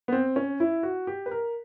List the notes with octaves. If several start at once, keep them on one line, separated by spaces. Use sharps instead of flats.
B3
C4
C#4
E4
F#4
G4
B4
A#4